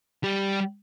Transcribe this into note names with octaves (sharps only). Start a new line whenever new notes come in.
G3 G4